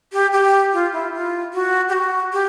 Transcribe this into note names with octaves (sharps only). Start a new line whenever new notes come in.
G4
G4
F4
E4
F4
F#4
G4
F#4
G4